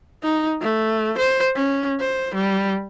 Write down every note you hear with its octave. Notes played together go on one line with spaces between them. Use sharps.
D#4
A3
C5
C#4
C5
G3